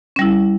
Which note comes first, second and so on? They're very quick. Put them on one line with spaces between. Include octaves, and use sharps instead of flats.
C#4 G3 E4